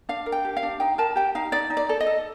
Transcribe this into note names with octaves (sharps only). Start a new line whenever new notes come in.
D4 F5
A#4
G5
G4
F5
D4
D#4 G5
A#4 A5
G4 G5
D#4 F5
D#4 D5
D#4
D5
A4
D#5
A4